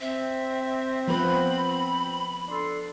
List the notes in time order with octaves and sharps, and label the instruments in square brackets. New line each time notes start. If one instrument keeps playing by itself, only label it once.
[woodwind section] C4 [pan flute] E5
[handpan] F3 B3 B4 [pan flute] B5
[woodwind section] D4 A4 C6